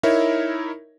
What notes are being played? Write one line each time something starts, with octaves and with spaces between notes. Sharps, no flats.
D#4 E4 A#4 C#5 E5